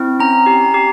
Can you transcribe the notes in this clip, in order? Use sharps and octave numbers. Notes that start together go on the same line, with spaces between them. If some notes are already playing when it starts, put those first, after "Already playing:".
Already playing: C4 E4
C#4 A#5
G4
G4